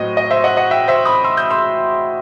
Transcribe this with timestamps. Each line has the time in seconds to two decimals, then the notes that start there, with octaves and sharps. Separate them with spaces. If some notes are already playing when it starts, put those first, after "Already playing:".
Already playing: A2 F#3 C4 D#5
0.17 D#5
0.31 C5 E5
0.44 D#5 F#5
0.57 D#5 F#5
0.71 E5 G5
0.88 C5 E5
1.05 B5 D#6
1.24 C6 E6
1.37 E6 G6
1.50 C6 E6